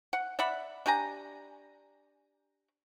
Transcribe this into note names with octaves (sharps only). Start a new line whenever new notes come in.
F#5
D5 E5 F#5 B5
D4 G4 G#5 A#5